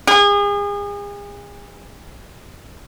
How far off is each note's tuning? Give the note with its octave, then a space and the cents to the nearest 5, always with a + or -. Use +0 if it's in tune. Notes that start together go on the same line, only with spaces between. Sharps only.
G#4 -35